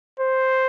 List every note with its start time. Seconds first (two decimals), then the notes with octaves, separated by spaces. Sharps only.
0.20 C5